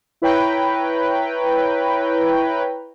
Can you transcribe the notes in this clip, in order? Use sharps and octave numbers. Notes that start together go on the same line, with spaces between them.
E4 B4 C#5 G5 A#5